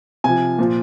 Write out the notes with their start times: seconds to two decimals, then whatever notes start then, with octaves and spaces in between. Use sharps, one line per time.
0.24 C3 F3 G#5
0.58 A#2 F3